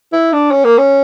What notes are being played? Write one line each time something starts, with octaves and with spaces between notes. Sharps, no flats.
E4
D4
C#4
A#3
C#4